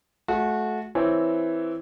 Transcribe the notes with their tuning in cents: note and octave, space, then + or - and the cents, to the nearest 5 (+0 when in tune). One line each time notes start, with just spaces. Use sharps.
A3 -30 F#4 -20
E3 +0 C4 +0 C#5 +0